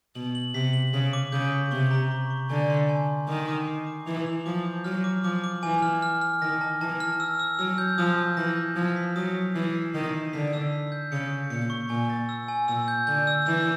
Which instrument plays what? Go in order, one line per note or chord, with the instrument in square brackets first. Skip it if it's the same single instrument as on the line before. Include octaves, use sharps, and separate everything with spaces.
[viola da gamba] B2 [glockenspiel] F#7
[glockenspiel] F#7
[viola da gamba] C3 [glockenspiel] B6
[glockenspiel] F#7
[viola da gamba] C#3 [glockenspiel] B6
[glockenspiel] D6
[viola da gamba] C#3 [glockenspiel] G6
[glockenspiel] B6
[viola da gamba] C3 [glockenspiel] C#6
[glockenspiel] A#5
C#6
C#6
[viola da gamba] D3 [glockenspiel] G#5
[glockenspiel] C6
G#5
C6
[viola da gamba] D#3 [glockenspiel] D6
[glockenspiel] D6
C7
D6
[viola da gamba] E3 [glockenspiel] F7
[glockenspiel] F7
[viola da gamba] F3 [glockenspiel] D6
[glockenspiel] G6
[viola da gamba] F#3 [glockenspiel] F6
[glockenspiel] D6
[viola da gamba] F3 [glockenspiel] D6
[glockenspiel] D6
[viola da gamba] E3 [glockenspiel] G#5
[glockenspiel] F6
F6
F6
[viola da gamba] D#3 [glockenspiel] A#6
[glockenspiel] A5
[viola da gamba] E3 [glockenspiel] A5
[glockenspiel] F6
E6
E6
[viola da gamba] F#3 [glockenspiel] E6
[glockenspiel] G6
[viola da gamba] F3 [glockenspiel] D#6
[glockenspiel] G6
[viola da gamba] E3 [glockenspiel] A#6
[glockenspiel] G6
[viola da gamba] F3 [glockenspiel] G#6
[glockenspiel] B6
[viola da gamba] F#3 [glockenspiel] D#6
[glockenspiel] B6
[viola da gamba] E3 [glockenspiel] C7
[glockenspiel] C7
[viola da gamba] D#3 [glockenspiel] C7
[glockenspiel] C7
[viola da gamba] D3 [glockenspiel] B6
[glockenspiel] E6
B6
G6
[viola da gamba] C#3 [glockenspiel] C#7
[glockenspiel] C#7
[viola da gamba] A#2 [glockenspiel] C#7
[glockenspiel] C#6
[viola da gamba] A#2 [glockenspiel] G#5
[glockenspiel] A6
E6
G#5
[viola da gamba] A#2 [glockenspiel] E6
[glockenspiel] G6
[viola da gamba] D3 [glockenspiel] G6
[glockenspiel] E6
[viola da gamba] E3 [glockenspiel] E6